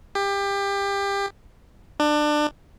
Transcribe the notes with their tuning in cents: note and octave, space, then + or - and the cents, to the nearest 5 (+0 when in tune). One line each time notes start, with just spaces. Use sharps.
G4 +25
D4 +25